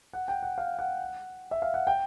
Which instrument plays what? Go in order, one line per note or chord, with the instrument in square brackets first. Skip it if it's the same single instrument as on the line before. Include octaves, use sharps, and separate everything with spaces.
[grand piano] F#5
G5
F#5
F5
F#5
E5
F5
F#5
G5